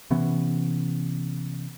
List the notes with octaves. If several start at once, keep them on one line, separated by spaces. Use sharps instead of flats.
C3 E3 B3 C#4